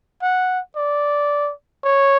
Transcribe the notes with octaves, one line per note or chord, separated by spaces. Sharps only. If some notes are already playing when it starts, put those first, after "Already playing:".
F#5
D5
C#5